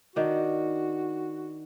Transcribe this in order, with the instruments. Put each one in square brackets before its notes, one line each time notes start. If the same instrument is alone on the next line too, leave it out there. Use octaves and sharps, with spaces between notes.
[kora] D#3 D4 [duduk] F#4